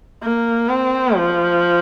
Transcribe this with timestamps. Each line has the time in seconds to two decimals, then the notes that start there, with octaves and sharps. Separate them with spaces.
0.23 A#3
0.69 C4
1.15 F3